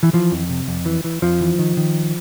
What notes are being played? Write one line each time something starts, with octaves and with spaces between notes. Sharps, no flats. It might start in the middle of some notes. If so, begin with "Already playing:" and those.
E3
E3 F3
F2
C3
F2
E3
E3
F2 F3
E3
D#3
D#3